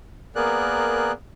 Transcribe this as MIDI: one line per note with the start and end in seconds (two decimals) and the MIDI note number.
0.36 1.12 58
0.36 1.12 59
0.36 1.12 68
0.36 1.12 70
0.36 1.12 74
0.36 1.12 90